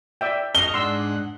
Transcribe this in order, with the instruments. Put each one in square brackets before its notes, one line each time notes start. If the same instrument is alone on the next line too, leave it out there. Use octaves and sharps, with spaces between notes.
[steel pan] D5 E5 G5
[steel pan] D#5 [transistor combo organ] C#6 [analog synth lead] F6 [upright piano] G7
[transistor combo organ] G#2 F#5 [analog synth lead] D4 [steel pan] C6 E6